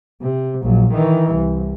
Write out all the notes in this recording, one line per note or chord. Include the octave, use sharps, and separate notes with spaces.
C3
A#1 F#3
D#3 E3
C2